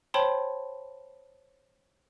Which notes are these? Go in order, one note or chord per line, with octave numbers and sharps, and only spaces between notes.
C5 C#5 G5 A5 B5 C6